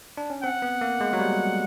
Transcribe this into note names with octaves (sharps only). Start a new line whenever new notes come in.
D4
C#4
C4 F#5
B3
A#3
G#3
F#3
G3